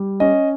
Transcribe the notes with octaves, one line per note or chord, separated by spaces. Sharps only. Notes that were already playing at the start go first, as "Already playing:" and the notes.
Already playing: G3
C#4 D#5